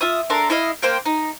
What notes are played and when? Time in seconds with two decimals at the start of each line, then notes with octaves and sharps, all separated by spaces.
0.01 F4 E5 D#6
0.30 D4 A4 A#4 C6
0.50 E4 D#5 F5
0.83 A#3 C5 F5 G5
1.06 D#4